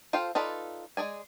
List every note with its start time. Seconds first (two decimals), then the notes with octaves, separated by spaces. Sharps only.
0.13 F4 A4 C5 F5 G5
0.35 D#4 F4 A4 B4 D5
0.97 G#3 G#4 D5 G#5